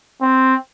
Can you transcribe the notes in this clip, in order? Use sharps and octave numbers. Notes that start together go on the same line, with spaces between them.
C4